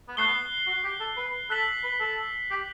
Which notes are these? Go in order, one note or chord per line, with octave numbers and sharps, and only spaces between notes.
B3
A3 F#6 C7 G7
B3
F#4
G4
A4
B4
A4 F#6 B6 F#7
B4
A4
G4